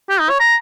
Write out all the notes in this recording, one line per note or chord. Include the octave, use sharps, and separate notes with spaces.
G4
D#4
C#5
A#5